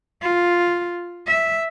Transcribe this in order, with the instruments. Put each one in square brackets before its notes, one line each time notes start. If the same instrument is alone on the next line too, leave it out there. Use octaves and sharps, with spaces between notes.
[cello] F4
E5